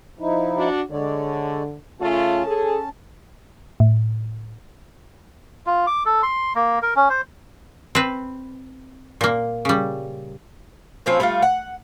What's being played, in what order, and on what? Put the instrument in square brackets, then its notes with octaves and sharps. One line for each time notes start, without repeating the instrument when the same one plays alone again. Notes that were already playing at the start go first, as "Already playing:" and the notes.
[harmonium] F3 D#4 E4
[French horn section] D4 F#4
[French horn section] D3 [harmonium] G#3 C#5 D5
[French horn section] C#3 A3 F4 [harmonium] C#4 A5
[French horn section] G#4 A4
[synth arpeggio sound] A2
[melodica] F4
D6
A4
C6
A#3
A#4
C#4
C5
[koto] C4 B4
A#2 A#3
C#3 G3
[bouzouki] F3 C4 C#4 B4
G3 A3 B3 F4
F#5